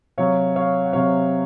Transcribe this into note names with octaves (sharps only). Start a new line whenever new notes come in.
C3 F#3 C#5 F5
C#5 F5
F#5
C3 F#3 C#5 F5